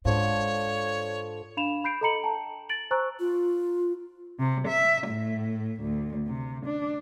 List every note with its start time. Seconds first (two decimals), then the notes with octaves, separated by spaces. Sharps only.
0.05 G#2 D3 F3 C#5
1.57 D4 F5 B5 E7 F7
1.84 B5 G6 C7 D7
2.01 A4 D#5 A#5 B5 C#7 F#7
2.23 G5 A5 A#5
2.69 A6 D7 F#7
2.91 C5 G#5 A#5 C#6 E6 F#6
3.20 F4
4.39 C3
4.68 E5
5.08 A2
5.82 D2
6.27 C3
6.66 D4